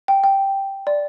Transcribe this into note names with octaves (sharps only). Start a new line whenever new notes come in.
G5
G5
D5